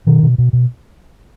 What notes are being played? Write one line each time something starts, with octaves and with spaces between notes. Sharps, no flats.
B2 D#3
B2
B2
B2